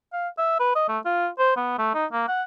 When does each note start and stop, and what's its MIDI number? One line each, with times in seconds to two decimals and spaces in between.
0.13 0.28 77
0.38 0.56 76
0.60 0.71 71
0.75 0.85 75
0.88 0.99 57
1.05 1.28 65
1.39 1.53 72
1.56 1.77 59
1.78 1.90 57
1.94 2.06 63
2.12 2.24 58
2.28 2.43 78